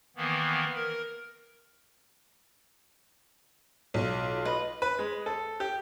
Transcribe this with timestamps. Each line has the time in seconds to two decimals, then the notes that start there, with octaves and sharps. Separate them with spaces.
0.16 D#3 E3 A#3 B3
0.75 A#4
3.94 B1 F4
4.45 B4 D#5
4.82 B4
4.99 G#3
5.26 A4
5.60 G4